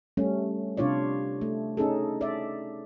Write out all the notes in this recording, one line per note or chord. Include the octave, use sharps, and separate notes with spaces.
G3 A3 C#4
C3 D4 F4 C#5 D5
A3
C#4 D#4 G#4 A4
D5 E5